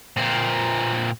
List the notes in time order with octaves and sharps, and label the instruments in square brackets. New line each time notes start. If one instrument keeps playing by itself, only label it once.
[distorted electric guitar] A#2 C4